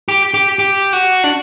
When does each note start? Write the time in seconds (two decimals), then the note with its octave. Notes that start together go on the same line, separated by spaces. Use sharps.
0.08 G4
0.34 G4
0.59 G4
0.93 F#4
1.24 D4